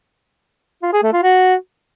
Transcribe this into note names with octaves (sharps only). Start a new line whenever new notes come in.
F4
G#4
A3
F4
F#4